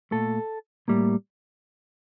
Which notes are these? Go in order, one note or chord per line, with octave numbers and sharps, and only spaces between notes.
A#2 A3 A4
A2 G3 A#3